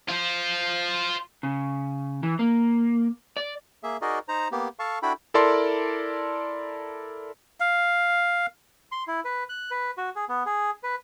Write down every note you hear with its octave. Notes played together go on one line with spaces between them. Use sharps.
F4 C5
C#3
E3
A#3
D5
A#3 G#4 E5
D#4 F#4 G#4 A#4 D5 D#5
D#4 C5 A#5
A#3 B3 G4
A4 F5 A5 C#6
D4 E4 F#4 A4 G5 B5
E4 A4 A#4 D5 A5 C6
F5
C6
E4
B4
F#6
B4
F#4
G#4
B3
G#4
B4